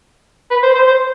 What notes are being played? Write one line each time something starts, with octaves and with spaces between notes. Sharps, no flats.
B4
C5
C5
C5